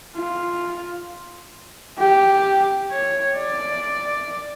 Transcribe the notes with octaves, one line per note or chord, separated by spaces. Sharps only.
F4
G4
C#5
D5